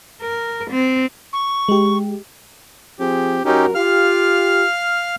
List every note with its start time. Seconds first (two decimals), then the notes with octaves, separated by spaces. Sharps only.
0.22 A#4
0.71 C4
1.33 C#6
1.69 G#3 G4
2.99 F3 C4 G4 G#4
3.45 F#2 C#4 D#4 F#4 G4 A#4
3.75 F4 G4 F5 F6